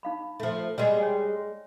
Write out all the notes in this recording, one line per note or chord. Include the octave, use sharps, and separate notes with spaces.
D#4 F5 B5
F3 A3
G3 G#3 G#4 D5 D#5
C#5 G5 G#5